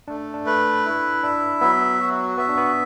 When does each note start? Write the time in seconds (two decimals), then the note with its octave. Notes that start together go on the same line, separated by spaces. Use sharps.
0.08 A3 D4
0.34 D4
0.46 B4
0.85 E4
1.23 D4 E5
1.61 F#3 B3
2.00 F#4
2.38 B3 E5
2.49 D4
2.58 B3